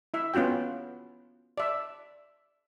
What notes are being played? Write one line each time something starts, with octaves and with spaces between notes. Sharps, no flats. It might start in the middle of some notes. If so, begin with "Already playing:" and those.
E4 E5
B3 C#4 F4 F#4 G5
D5 E5